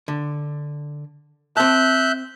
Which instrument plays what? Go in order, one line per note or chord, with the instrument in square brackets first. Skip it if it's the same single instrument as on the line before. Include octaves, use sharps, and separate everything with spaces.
[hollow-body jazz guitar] D3
[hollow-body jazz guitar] C4 A5 [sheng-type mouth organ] E5 F#6 G6